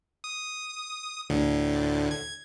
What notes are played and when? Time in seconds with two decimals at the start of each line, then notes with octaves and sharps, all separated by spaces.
0.24 D#6
1.30 D2 A2 D3
2.11 G#6